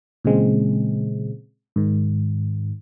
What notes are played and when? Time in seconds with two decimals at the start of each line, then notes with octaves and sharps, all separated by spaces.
0.24 A#2 C#3 E3 G#3 C4
1.76 G#2 D#3